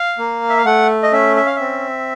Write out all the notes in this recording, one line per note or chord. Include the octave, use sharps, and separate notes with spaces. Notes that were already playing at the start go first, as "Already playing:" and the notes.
Already playing: F5
A#3
E5
F5
A3 F#5
D#5
C#4 E5
E5
F5
C4 E5